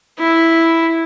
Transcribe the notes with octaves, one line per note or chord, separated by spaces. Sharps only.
E4